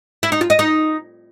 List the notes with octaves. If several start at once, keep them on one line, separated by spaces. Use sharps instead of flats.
E4
D#4
F4
D#5
D#4